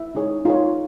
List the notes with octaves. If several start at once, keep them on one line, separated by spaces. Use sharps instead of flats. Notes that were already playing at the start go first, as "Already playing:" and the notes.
Already playing: E4 E5
D#4 G#4 C#5
D#4 F4 G#4 C#5 F5